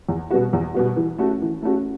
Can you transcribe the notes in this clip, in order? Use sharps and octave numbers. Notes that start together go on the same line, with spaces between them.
E2
B2 G3 B3 F#4
E2
B2 G3 B3 F#4
E3
A3 C#4 F#4
E3
A3 C#4 F#4